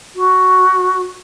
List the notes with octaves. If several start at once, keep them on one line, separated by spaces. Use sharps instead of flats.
F#4